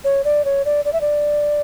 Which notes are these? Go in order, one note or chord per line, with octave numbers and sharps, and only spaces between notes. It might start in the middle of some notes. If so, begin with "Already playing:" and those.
C#5
D5
C#5
D5
D5
E5
D5